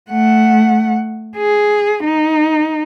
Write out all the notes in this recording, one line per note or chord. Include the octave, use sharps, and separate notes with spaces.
A3 F#5
G#4
D#4